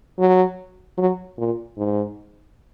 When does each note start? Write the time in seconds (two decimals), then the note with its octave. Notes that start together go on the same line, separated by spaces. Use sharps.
0.19 F#3
0.98 F#3
1.38 A#2
1.77 G#2